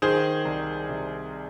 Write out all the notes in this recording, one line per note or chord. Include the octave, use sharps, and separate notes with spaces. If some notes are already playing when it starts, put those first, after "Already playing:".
D#3 G#4 C5
C2
C3